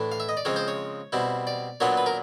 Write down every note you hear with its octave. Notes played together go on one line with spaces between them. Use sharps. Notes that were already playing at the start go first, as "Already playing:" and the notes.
Already playing: A2 E3 A3 D4
F5
E5
D#5
D5
C#3 F3 G#3 C4 C#5
C5
C#5
B2 G3 C4 E4
D5
A#2 F#3 B3 D4 F4 C#5
B4
A#4